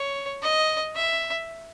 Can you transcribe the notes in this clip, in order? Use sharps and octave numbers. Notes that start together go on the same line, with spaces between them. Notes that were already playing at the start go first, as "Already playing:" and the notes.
Already playing: C#5
D#5
E5